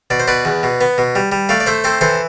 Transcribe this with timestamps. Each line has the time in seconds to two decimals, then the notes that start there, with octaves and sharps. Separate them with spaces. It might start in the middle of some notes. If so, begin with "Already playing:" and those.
0.10 B2 D5
0.20 C5
0.28 B2 B4 D5
0.45 E2
0.63 B2
0.81 B3
0.98 B2
1.15 G3
1.32 G3
1.49 A3 D5 F5
1.60 D5
1.66 A3 C5 E5
1.84 C4 A4 C5
2.01 E3 A4 C5